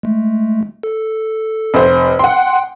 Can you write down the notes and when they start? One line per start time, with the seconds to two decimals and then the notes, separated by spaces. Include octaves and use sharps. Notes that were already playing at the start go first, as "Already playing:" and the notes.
0.03 G#3 A3
0.83 A4
1.74 F1 C5
2.19 F#5 G5 C6